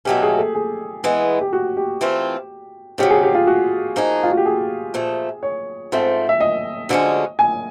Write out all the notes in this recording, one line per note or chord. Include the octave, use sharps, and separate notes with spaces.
B2 F#3 A3 C#4 G4
G#4
A4
G#4
E3 G#3 B3
G4
F#4
G4
E3 A3 C4 F4
F2 C#3 F#3 G4
G#4
G4
F4
F#4
F3 A#3 D#4 G#4
F4
F#4
G4
G#4
A#2 F3 A3
C#5
G#2 F3 A3 C4
E5
D#5
D2 D3 F3 G#3 C#4
G#5